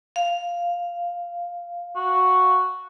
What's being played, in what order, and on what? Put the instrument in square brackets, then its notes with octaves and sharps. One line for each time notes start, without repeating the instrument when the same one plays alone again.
[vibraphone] F5
[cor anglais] F#4